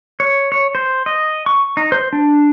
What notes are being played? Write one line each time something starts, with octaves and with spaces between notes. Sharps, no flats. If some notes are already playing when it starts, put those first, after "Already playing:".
C#5
C#5
C5
D#5
C#6
D#4
C5
D4